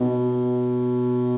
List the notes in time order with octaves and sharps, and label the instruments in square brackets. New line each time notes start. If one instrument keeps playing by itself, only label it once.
[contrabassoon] B2